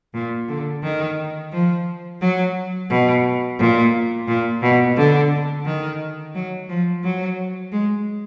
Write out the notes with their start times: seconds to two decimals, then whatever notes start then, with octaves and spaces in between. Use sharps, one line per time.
0.14 A#2
0.49 D3
0.83 D#3
1.52 F3
2.21 F#3
2.90 B2
3.59 A#2
4.28 A#2
4.62 B2
4.97 D3
5.66 D#3
6.35 F#3
6.69 F3
7.04 F#3
7.72 G#3